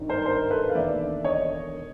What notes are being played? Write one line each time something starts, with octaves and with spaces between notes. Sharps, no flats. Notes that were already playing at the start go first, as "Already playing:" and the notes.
Already playing: G#1 G2 D#3
A#4 C5
A#4 C5
A4 B4
F5
E1 D#2 D3 D5 E5
C#5 D#5